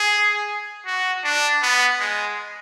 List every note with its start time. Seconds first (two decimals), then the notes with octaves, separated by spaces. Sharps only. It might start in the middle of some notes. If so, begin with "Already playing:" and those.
Already playing: G#4
0.86 F#4
1.24 D4
1.62 B3
2.00 G#3